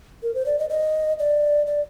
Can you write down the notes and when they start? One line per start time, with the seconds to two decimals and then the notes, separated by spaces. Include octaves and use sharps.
0.23 A#4
0.35 C5
0.46 D5
0.59 D#5
0.70 D#5
1.19 D5
1.67 D5